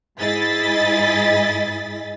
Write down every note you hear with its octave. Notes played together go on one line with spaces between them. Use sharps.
G#2 E4 G#4 D#5 A6 B6